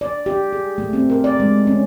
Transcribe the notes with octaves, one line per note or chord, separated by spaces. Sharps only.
D5
G4
G#4
A3
C4
A#4
D5
G#3
C#4